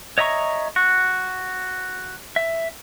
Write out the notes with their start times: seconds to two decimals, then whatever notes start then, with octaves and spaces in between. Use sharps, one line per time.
0.18 C#5 D#5 E5 A#5 C#6
0.76 F#4
2.36 E5